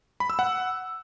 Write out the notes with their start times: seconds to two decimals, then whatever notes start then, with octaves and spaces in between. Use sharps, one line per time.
0.20 B5
0.30 E6
0.39 F#5